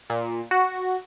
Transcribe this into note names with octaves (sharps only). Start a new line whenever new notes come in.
A#2
F#4